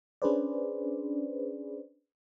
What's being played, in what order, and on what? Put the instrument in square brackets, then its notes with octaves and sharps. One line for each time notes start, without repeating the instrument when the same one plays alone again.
[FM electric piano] C#4 D4 G#4 B4 C5 D5